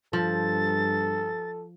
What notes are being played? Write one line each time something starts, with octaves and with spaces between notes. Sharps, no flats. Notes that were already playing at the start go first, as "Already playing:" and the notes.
G2 F3 A4 A6